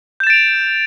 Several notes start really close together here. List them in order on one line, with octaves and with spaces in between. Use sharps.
G6 E7 A6 D7 F7